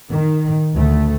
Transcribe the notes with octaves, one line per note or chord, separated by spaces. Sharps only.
D#3
D2 A3